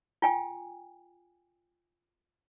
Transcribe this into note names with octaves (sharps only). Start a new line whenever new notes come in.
F4 G5 G#5